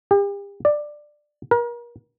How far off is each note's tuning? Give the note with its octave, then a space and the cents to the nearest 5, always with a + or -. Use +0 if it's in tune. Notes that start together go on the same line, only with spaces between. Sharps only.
G4 +40
D5 +15
A#4 +35